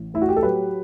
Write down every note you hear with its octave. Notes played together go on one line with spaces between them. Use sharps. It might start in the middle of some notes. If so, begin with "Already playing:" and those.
Already playing: A1
A2 E4
F#4
G4
A4
F#3 G4 B4